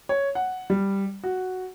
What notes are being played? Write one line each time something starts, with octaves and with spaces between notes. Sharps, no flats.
C#5
F#5
G3
F#4